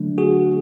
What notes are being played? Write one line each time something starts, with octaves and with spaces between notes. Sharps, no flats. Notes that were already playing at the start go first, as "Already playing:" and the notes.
Already playing: D3 F#3 A3 D4
F#4 G#4